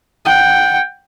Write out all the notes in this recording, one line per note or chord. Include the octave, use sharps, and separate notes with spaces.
F#5 G5